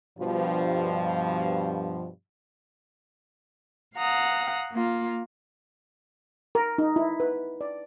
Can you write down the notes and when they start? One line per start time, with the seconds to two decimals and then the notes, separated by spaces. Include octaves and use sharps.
0.19 G2 B2 F3
3.96 F5 F#5 A#5 D#6
4.72 A#3 F4
6.55 A#4
6.78 D#4
6.96 E4
7.20 B4
7.61 D5